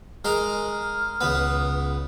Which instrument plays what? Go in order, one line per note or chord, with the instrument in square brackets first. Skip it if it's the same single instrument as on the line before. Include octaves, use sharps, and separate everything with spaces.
[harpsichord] G#3 A#4 A#5 [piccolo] F6
[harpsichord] C#2 B3